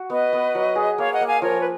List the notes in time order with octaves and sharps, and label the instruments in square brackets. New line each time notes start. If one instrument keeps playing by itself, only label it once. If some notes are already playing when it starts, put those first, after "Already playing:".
Already playing: [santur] F#4
[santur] B3 [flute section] B4 D#5
[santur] B3
F#3
G#4
[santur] A#3 [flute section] C#5 F5
[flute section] D#5 F#5
[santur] A#3
[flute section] F5 G#5
[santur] F3 [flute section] A#4 C#5
[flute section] B4